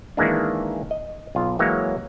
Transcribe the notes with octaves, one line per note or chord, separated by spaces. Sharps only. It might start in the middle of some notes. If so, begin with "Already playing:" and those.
D#3 E3 G#3 A#3 D4
D#5
B1 F4
E3 F#3 G#3 A#3 C#5